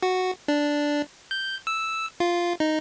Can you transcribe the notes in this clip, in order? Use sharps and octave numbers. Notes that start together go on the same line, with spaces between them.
F#4
D4
G6
E6
F4
D#4